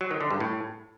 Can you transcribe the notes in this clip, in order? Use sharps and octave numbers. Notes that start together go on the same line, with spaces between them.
F#3
D#3
D3
G2
A2